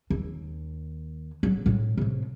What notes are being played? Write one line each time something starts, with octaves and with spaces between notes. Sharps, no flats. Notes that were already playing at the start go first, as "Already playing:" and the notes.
D#2
A1 F#3
A2 G#3
A2 C3